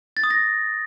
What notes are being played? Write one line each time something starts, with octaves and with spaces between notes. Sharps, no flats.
A6
D#6
A#6